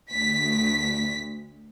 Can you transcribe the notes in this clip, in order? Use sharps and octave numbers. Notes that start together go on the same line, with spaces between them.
D2 B6